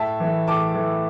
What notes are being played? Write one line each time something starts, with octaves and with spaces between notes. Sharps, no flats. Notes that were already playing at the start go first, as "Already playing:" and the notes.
Already playing: A2 E5 A5
E3 A3
A2 A5 D6
E3 A3